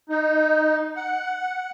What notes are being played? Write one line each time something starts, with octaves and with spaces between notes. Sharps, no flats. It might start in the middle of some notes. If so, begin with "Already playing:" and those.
D#4
F#5